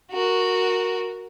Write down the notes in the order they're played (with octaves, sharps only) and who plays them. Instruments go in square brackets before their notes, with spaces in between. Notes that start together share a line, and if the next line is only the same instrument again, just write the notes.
[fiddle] F#4 A#4